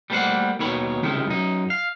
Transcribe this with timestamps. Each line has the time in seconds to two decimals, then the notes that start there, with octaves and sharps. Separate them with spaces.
0.10 G3 A3 A#3 G4 C5 F#5
0.59 D#2 B2 D#3 C#5 B5
1.03 C#2 C3 D#3 E4
1.28 F#2 D#4
1.70 F5